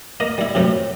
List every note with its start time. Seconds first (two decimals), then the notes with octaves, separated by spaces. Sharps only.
0.20 A#3 D#5
0.38 G3 E4
0.55 F#2 A2 C3 A3